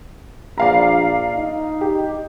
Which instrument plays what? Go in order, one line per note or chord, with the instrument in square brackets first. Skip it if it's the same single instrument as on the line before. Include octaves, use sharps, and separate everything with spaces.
[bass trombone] A#1 [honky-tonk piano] D5 F5 A#5
[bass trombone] D#4
[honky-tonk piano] G4